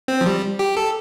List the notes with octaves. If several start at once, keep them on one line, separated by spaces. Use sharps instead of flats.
C4
F3
G3
G4
A4